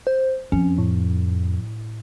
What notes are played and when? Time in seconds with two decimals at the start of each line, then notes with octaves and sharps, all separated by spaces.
0.07 C5
0.52 F2 C#4
0.78 A2